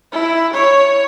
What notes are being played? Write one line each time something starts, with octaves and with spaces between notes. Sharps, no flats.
E4
C#5